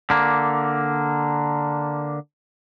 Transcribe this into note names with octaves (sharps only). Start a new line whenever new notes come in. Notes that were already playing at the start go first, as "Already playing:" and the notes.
D3 A#3